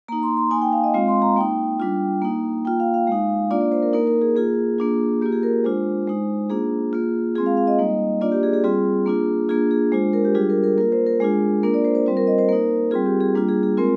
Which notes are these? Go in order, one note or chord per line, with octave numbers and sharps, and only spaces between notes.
A#3 D#4 A#5
C6
C6
A#3 D#4 G#5
G5
F5
D#5
G#3 C4 F4 F5
C6
A#5
A#3 D#4 G5
G3 D4 F4
A#3 D#4
A#3 F4 G5
F5
F5
G#3 D#4
A#3 D4 F4 D5
D5
C5
A#4
A#3 D#4 A#4
A#4
G#4
A#3 F4 G#4
A#3 D4 F4
A#3 F4 G4
G#4
A#4
G#3 D4 F4 C5
G#3 D#4
A#3 D4 F4 G#4
A#3 F4
G#3 C4 F4 G#4
F5
F5
D#5
G3 A#3 D#4
A#3 D4 F4 D5
G4
G#4
G#4
G3 C4 F4 G#4
A#3 D4 F4
A#3 D4 F4 G#4
G#4
G#3 D4 F4 C5
A#4
G4
G3 D4 F4 G#4
A#4
A#4
A#3 F4 A#4
C5
A#4
G#3 D4 F4 G#4
A#3 D4 F4 A#4
D5
C5
C5
G3 C4 F4 C5
A#4
D#5
C5
A#3 D#4 A#4
G3 C4 F4 G#4
G4
G#4
G3 A#3 D4 F4
G#4
G#4
G#3 C4 F4 A#4